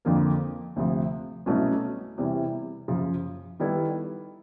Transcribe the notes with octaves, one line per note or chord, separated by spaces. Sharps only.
F2 D3 F3 A#3
D2 C3 F3
C2 B2 F#3 A3 C#4
E2 C3 E3 G3
F#2 C#3 F3
D#3 G3 B3 E4 A4